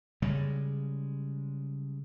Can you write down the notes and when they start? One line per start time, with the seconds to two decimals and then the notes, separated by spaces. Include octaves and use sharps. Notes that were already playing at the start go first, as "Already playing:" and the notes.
0.22 C#3 G3 G#3